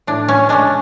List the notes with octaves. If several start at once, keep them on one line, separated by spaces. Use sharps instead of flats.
A2 D4
C#4
G#3 C#4 D4